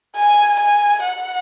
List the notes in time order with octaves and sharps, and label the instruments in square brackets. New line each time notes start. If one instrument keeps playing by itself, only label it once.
[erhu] G#5
G#5
F#5